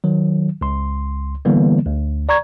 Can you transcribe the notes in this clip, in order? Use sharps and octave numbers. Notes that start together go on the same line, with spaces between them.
D#3 F#3
C#2 C6
D3 E3 G3 A#3 B3
D2
D5 A#5 C#6 G#6